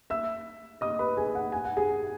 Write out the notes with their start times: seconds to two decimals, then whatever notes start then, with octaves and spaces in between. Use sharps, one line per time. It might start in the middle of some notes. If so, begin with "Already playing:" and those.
0.10 E5 E6
0.81 D#5 D#6
0.99 B4 B5
1.17 G#4 G#5
1.35 F#5
1.52 G#5
1.65 F#5
1.77 G#4 G#5